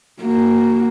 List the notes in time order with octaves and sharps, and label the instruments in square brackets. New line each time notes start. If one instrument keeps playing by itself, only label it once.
[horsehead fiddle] A#3 F#4